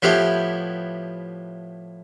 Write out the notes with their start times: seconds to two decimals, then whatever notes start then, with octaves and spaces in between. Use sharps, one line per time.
0.02 A2 F3 B3 E4 G4